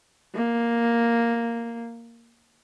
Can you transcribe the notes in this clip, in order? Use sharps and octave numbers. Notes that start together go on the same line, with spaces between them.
A#3